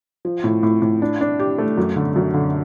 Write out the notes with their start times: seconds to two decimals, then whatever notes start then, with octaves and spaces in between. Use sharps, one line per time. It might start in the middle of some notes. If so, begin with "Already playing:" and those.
0.25 F3
0.44 A2
0.63 A2
0.82 A2
1.02 D4
1.21 D4
1.40 G4
1.58 A3
1.78 F#2
1.96 D3
2.16 F#2
2.34 D3